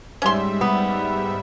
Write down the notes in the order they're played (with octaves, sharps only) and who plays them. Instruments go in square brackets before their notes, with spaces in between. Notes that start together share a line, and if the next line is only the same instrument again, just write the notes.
[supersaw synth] G#2 G3 E5 [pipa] C#4 C6
[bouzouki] B3